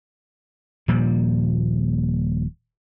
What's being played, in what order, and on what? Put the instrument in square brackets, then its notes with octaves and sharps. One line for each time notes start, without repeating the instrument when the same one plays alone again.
[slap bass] D#1 A#2 F3 G3